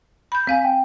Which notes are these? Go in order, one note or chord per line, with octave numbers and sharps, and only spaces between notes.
B5 G6
C4 F5 G#5
G5